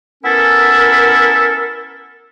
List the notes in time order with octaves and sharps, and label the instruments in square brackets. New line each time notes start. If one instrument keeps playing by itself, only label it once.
[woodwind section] B3 C#4 E4 A4 A#4